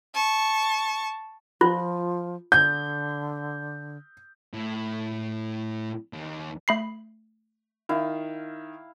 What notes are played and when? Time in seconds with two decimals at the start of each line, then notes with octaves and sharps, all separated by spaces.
0.14 A5 C#6
1.61 F3 F4
2.52 D3 G6
4.54 A2
6.13 D#2
6.68 A3 B5 C7
7.89 D#3 E4 F5